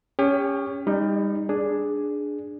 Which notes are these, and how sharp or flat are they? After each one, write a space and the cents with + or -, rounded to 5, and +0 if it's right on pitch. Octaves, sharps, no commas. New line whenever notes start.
C#4 +10 G4 +45 G5 +0
G3 +30 D#4 +0
D4 +0 G#4 +0